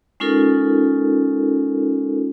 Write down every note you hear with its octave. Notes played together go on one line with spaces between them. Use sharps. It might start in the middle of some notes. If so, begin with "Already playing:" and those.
G#3 C#4 D#4 F4 A4 A#4